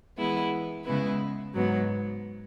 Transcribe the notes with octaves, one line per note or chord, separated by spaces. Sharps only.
E3 G#3 B3 E4
C#3 G#3 B3 E4 B4
G#2 F#3 B3